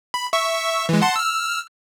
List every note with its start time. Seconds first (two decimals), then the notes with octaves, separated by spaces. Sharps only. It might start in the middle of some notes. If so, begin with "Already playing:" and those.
0.14 B5
0.33 E5 C#6 E6
0.89 E3 G#3
1.02 F#5 A5 C6
1.16 E6 F6